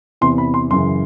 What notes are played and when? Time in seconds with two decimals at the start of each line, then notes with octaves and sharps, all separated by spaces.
0.21 E2 C3 E3 C6
0.38 B5
0.54 C6
0.70 F#2 C#3 E3 C6